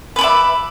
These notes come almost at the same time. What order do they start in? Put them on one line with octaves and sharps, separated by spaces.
B4 B5 D6 E5